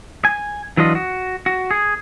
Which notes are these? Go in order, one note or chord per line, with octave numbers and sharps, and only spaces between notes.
G#5
E3 F#3 D4 F4 D#5
F#4
F#4
G#4